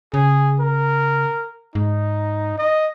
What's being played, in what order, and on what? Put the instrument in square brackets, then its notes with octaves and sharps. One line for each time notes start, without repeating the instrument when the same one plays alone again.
[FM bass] C#3 [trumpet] G#4
[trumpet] A#4
[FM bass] G#2 [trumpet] D#4
[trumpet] D#5